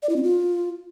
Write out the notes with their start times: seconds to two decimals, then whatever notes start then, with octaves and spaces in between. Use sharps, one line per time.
0.02 D5
0.09 E4
0.16 C4
0.23 F4